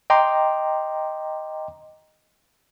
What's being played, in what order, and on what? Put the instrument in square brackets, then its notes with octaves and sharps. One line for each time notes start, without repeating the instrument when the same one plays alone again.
[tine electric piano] D#5 G5 A#5 C6 D6